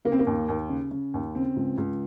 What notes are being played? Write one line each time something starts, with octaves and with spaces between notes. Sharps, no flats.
C#3 A#3
C4
A#3
D#2
D#2
C#3
C#3
D#2
C#3 C4
C#2
C#2